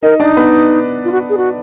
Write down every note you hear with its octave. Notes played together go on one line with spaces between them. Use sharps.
D#4 A#4 D#5
D4 D#4 D5
B3 B4
F4
F#4
G#4
F#4